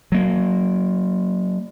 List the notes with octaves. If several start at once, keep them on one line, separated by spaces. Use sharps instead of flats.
F#3 A#3